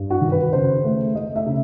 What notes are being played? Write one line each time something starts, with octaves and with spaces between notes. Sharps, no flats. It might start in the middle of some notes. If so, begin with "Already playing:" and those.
Already playing: G2
F#4
D#3
B4
C#3 C5
A3
A3 D#5
E5
C#3